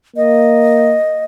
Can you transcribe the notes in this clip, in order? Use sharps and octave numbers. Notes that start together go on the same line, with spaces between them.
A#3 D#5